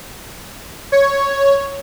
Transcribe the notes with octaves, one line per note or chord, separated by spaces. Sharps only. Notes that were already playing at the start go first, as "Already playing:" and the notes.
C#5